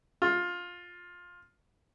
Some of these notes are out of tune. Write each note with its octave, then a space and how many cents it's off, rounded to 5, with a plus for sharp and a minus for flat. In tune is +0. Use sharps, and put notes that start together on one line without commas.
F4 +15